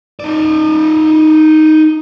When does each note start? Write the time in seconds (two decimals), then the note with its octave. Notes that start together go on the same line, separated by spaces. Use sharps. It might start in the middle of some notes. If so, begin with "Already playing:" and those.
0.20 D#4 D5